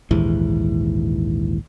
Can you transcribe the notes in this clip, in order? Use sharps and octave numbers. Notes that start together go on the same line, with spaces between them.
A#1 D#2 G#2 E3